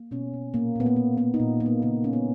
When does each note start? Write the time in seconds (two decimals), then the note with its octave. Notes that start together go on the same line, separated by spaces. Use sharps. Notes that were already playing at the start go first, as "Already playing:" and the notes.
Already playing: A#3
0.11 B2 C#4
0.34 B2
0.54 A#2 A#3
0.76 A#2 B3
0.86 A#3
0.96 A#3
1.17 A#3 B3
1.34 D#4
1.40 A#2
1.60 A#2 A#3
1.66 B3
1.82 C#3 A#3
2.03 G#3 C#4
2.13 B3